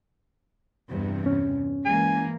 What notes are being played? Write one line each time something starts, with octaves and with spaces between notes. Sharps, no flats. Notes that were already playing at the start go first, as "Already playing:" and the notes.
E2 G2 C3
C#4
E3 G#3 A#3 G#5